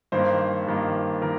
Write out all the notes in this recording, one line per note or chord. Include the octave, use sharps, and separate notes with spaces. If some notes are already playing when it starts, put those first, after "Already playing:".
G2 D#3 A#3 C5
G2 D#3 A#3
D#3 A#4